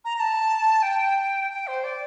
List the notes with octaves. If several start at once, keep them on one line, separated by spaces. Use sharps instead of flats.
A#5
A#5
A5
G5
G5
C5
D5